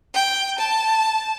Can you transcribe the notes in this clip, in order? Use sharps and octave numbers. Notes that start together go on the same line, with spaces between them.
G5
A5